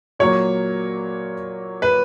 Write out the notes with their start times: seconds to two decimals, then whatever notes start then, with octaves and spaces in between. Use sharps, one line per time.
0.19 A#2 F#3 A#3 C#5
1.82 B4